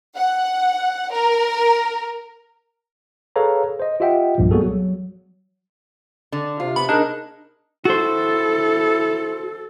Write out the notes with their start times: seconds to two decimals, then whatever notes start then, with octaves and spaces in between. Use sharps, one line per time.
0.17 F#5
1.13 A#4
3.36 G#4 A4 B4 C#5 F5 A#5
3.80 C5 D#5
4.00 F4 G4 D#5 E5 F#5 G5
4.38 C2 G2 A#2 F3
4.51 G3 A#3 B3 F#4 G#4 A4
4.63 F#3
6.32 D3
6.60 C3 F4
6.76 B3 B5
6.89 A#3 D4 D#4 G#4 A#4
7.85 E4 F#4 A4 C5